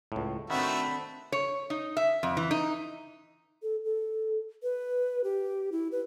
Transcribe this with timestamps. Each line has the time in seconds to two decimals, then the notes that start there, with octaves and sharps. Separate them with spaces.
0.12 C#2 A2
0.50 D#3 A3 C4 D4 F#4 E5 B5
1.32 C#5
1.70 D#4
1.97 E5
2.23 F2
2.37 E3
2.51 D#4
3.63 A4
3.85 A4
4.63 B4
5.24 G4
5.72 E4
5.92 B4